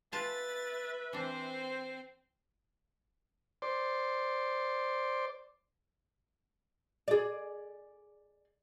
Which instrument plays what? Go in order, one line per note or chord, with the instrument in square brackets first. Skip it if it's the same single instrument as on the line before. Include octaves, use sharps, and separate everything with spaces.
[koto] F4 G#5 A5 [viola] B4 E5 [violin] A6
[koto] E3 D4 [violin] C4 C5
[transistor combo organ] C5 D5
[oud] G#4 D5